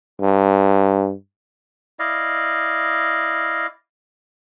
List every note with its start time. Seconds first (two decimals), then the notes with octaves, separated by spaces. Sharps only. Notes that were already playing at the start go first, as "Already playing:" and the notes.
0.21 G2
1.99 E4 D5 D#5 F5